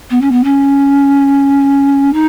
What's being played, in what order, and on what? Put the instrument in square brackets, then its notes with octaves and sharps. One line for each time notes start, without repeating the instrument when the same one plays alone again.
[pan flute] B3
C#4
B3
C#4
D#4